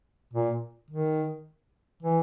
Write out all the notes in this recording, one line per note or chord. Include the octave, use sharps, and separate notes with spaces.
A#2
D#3
E3